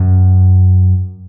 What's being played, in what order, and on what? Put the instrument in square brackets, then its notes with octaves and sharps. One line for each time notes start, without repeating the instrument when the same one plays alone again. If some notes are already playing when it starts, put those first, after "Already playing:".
Already playing: [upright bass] F#2